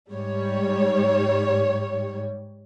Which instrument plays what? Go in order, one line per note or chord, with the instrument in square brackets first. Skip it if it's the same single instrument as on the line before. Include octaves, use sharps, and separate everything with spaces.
[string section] G#2 G3 C#5